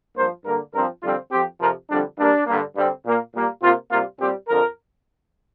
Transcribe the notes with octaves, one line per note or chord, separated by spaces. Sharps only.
G2 F3 A#3 C5
G2 D3 A#3 A#4
G2 F3 C4 A#4
F2 D3 G3 C4 F4
F2 F3 C4 G4
F2 C3 F3 A#4
F2 D3 G3 D4
G2 G3 A#3 D4
G2 D3 A#3
G2 D3 G3 C4
A#2 A#3
A#2 G3 A#3
C3 A#3 F4
C3 G3 A#3 F4
A#2 G3 C4 G4
F2 D3 F3 A#4